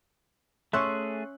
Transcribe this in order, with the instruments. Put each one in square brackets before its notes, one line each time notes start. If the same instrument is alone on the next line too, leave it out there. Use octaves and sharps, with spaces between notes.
[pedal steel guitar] A3 G#4 [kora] C#4 E5 [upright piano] C6 C#6 F#6